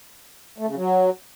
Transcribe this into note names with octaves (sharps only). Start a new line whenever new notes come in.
A3
C#3
F#3